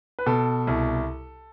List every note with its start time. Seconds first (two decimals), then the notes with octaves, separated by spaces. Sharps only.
0.19 B4
0.26 B2 A4
0.67 C2